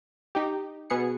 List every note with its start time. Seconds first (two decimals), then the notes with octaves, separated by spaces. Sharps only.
0.35 D#4 G4
0.90 B2 B3 G#4 C#7